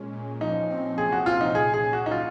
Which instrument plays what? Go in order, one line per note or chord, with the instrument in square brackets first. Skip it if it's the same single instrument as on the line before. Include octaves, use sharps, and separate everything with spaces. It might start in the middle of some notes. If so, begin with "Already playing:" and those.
Already playing: [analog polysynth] A#2 G#3 C#4
A#2
[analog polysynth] F3 [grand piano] D#4
[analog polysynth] C4
[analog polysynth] C3 [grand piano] G#4
[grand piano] F#4
[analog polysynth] C3 [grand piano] F4
[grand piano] D#4
[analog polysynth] A#2 [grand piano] G#4
[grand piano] G#4
[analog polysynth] C#4
[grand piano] F#4
D#4
[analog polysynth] F#3 [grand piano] F4